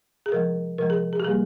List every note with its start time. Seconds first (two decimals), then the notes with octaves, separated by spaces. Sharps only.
0.26 G#4
0.32 C3 F3 G#3 A#4
0.78 C3 F3 G#3 A#4
0.90 G#4
1.13 G#4
1.20 G4
1.24 C3 G3 A#3 G#4